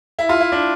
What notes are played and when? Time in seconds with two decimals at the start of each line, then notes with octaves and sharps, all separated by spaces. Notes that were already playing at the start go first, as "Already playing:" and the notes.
0.19 E4
0.29 F4
0.40 E4
0.52 D4